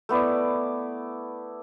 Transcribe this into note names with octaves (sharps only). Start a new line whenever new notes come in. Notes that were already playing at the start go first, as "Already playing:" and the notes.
A3 B3 E4 D5